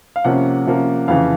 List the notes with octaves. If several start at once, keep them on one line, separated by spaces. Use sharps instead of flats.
F5
C3 F3 A#3 C#4 F#5
C3 F3 A#3 C#4
F2 C#3 E3 F5